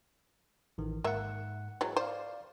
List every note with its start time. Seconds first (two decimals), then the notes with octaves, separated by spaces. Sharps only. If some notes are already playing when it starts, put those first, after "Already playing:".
0.78 A1 D#3
1.04 G#2 A#3 E5 F#5
1.81 E3 F#3 G#3
1.97 C5 D5 F5